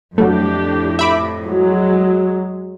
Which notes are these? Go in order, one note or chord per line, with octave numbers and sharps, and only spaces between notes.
F2 A2 F#3 G3 A3 D4 G4
E5 B5 D6
F#3 G#3